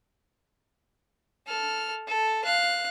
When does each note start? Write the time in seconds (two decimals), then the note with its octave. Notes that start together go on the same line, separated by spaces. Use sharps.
1.47 A4 F6
2.08 A4
2.45 F5 F#6